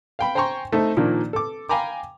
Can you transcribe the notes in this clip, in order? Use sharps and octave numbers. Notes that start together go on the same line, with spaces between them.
F5 G5 B5
C5 G5 G#5 A#5 C6 C#6
A3 C4 D#4 A4 E5
A#2 D#3 F3 A#3 D4
A4 D6
F5 G5 G#5 A#5 B5 D6